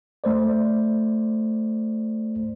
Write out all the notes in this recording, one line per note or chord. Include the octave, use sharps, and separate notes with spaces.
A3 C5 D5